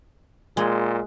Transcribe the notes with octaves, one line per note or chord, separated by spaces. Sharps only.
A#2 G#3